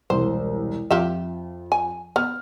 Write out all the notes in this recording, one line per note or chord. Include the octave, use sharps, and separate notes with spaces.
E1 C2 C5
F2 F4 G4 E5
G#5
B3 F6